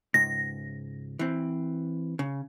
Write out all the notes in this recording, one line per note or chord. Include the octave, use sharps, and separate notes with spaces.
C#2 G#2 A#6
E3 C4
C#3